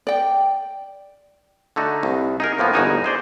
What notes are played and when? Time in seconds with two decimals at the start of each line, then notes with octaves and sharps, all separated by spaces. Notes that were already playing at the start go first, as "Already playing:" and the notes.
0.07 D5 G5
1.76 D3 A3 D#4 F#4
2.03 C2
2.40 D#4 G#4 A#4
2.58 A2 F3 A#3 B3
2.74 G1 E2 B2 D#4 F#4 G#5
3.04 G#4 C5 D5